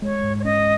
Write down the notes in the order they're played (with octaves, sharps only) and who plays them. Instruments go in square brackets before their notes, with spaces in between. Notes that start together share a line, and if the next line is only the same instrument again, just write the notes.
[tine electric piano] G#3 [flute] C#5
[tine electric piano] G#2
[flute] C#5
[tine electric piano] C#4 [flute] D#5